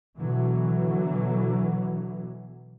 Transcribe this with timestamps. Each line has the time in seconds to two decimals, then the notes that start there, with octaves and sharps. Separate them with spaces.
0.19 B2 D3 E3 F#3